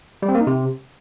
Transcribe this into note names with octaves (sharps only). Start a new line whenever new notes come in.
G3
C4
A#3
D#4
C3